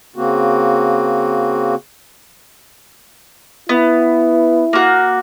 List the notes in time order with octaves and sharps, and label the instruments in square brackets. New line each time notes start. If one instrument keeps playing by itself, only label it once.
[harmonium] C#3 A#3 C4 F#4
[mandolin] B3 [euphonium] E4
[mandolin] A#3 F#4